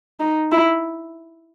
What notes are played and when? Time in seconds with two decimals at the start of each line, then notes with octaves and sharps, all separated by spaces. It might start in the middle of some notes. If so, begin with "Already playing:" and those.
0.20 D#4
0.52 E4